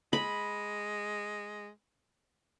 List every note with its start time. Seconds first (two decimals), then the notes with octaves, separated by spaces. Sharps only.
0.13 G#3 B5